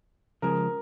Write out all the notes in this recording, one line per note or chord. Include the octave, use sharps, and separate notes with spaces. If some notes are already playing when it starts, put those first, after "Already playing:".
C#3 F3 G#3 A#4